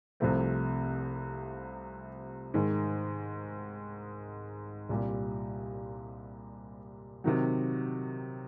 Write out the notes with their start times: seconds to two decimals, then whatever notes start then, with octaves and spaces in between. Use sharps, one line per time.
0.20 C2 C3 F3 A3 C4
2.54 G#2 D#3 G#3
4.89 C2 A#2 G3
7.24 C3 D#3 F#3